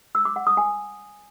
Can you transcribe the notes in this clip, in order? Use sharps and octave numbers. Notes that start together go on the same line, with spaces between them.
E6
D6
F#5
D#6
G#5